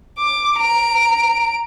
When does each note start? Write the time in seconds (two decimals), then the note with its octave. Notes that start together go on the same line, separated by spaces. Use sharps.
0.18 D6
0.58 A#5 D7